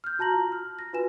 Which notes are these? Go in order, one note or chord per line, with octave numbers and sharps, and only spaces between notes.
F6 G6
F#4 A5 A#5 A#6 F#7
F4
F6
A#6
F4 F#4 B4 G#5 E7